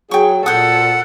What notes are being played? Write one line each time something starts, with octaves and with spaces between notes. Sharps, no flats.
F#3 G#4 G5 C#6
A#2 A4 C5 F#5 D#6